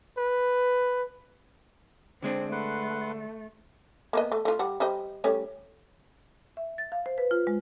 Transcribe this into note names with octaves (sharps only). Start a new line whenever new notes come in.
B4
D3 G#3 C4 D4
A3 B4 F#5 C6
A#3 B3 D#5
A3
A3 F4
G3 F#5
G3 C5 D#5
G3 A3 C#4
E5
A6
F5
C5
B4
F4
G#3